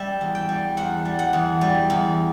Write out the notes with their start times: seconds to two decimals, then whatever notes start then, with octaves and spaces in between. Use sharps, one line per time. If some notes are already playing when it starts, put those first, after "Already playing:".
Already playing: G3 E5
0.21 E2
0.35 G5
0.49 G3
0.77 E2 F#5
1.05 G3
1.19 F#5
1.33 E2
1.61 G3
1.90 E2